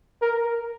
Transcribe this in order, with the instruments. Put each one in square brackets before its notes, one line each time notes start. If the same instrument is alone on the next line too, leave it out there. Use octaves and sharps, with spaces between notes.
[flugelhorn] A#4